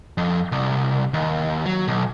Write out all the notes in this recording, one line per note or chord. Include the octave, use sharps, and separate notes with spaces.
F2
C2
D#2
F#3
B1